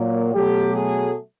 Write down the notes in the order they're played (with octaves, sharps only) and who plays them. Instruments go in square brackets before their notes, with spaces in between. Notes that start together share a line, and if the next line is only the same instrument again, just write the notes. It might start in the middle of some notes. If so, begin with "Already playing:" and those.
Already playing: [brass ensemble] A#2 F#3 A#3
B2 F#3 A3 G4
G#4